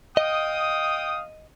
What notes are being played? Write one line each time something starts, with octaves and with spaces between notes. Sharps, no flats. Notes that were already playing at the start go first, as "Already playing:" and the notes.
D#5 F5 G5 D#6